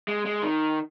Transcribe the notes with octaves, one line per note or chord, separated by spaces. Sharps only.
G#3
G#3
D#3